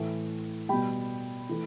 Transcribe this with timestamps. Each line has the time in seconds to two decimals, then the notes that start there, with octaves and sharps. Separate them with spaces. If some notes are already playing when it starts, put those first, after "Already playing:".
Already playing: A2 E3 A3
0.69 B2 G3 G5 B5
1.49 E3 A3